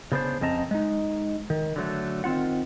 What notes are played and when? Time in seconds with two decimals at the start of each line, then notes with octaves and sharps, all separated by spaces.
0.12 C#3 B3 D4 C5
0.41 F2 C#3 C4 D#5 A5 A#5
0.71 G#3 D#4
1.50 D#3
1.76 D3 F#3 A3
2.24 D#3 C4 F4 F#5